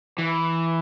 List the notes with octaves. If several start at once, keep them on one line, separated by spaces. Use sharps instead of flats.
E3